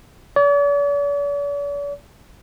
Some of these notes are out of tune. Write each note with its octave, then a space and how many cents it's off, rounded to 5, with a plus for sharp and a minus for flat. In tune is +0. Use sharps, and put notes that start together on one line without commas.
D5 -45